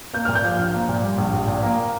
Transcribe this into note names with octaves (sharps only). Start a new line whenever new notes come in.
A#3 G6
A#2 F6
G6
F3
A#1
A#3
A#2
G3
A#1
A#1
A#2
A#3